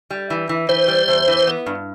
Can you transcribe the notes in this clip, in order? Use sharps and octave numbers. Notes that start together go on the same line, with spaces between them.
G3
E3
E3
E3 C5
G3
E2
E3
B3
G2